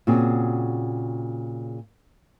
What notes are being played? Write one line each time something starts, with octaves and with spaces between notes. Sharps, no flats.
A#2 C#3 C4 F#4 G#4